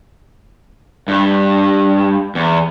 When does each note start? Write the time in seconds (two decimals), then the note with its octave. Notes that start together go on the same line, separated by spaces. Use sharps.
1.08 G2
2.35 E2